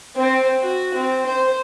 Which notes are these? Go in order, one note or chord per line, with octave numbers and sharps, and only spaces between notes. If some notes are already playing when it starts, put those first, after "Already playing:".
C4
F#4
C4
C5